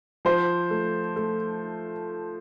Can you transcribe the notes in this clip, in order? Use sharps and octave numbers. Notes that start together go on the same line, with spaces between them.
F3 C5
A3
A3